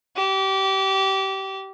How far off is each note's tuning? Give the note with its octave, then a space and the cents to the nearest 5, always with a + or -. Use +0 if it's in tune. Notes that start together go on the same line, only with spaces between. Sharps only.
G4 -25